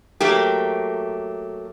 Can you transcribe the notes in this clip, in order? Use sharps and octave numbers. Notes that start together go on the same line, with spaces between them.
F#3 A3 A#3 G4